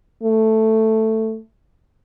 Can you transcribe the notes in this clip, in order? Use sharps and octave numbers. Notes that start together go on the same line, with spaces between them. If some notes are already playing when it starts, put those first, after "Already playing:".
A3